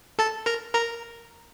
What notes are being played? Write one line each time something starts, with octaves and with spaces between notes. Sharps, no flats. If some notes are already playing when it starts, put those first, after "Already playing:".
A4 A5
A#4 A#5
A#4 A#5